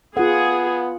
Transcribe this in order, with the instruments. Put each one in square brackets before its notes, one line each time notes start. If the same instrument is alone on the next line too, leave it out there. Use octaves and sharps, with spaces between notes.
[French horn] B3 [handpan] F4 F#5 [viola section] G#4